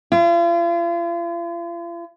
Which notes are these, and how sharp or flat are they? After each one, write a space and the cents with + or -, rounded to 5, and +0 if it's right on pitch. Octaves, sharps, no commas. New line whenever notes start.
F4 -40